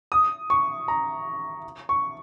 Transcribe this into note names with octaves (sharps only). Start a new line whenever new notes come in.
D#6
C#6
A#5
C#6